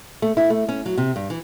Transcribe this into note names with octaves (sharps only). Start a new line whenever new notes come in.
A3
E4
A3
C#4
F#3
C3
G2
E3